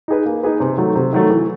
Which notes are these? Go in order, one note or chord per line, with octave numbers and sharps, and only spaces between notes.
D#4 G#4 B4
A#3
D#4 G#4 B4
C3
D#3 F#3 A3
C3
D#3 F#3 A3
E3